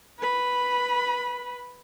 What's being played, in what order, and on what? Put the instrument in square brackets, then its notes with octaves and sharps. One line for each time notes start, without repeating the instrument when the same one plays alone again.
[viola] B4 B5